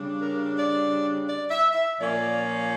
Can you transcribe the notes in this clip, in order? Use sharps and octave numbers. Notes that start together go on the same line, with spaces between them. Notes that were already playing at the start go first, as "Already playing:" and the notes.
Already playing: C#3 G3 D4
A#4
D5
D5
E5
E5
A#2 F3 A#3 C#4 D5